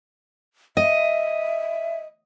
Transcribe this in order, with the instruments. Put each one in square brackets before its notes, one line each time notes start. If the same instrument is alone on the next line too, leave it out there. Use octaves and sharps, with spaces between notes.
[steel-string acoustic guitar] D#5 [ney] E5